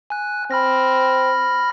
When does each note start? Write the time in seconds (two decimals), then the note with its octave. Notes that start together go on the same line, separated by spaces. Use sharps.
0.10 G#5 F#6
0.51 C4 B5 F6 A#6